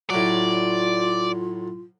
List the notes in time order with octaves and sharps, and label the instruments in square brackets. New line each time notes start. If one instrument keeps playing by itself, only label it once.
[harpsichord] A2 F#3 [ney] F4 [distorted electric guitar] D5